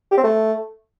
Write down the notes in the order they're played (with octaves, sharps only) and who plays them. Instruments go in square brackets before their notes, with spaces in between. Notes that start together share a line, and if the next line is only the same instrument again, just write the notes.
[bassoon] G4
C4
A3